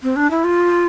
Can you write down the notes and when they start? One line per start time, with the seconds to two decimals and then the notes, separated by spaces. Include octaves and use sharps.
0.03 C4
0.16 D4
0.31 E4
0.44 F4